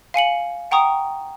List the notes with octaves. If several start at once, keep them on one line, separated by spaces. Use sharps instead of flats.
F5 G#5 C#7 F#7
F#5 G5 A#5 C#6 D#6